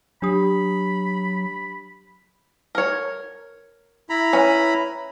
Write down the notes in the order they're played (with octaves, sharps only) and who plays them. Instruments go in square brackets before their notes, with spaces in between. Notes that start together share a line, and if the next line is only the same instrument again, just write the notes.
[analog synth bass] F#3 [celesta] D4 G4 D#6 [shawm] B5
[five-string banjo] A#4 C#5
[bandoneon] E4 A#5 B5
[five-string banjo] C#4 B4